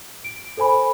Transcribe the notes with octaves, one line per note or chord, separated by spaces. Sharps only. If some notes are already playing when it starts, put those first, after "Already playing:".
D7
A4 C5 G#5 B5